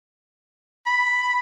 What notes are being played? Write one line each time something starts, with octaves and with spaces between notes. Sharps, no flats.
B5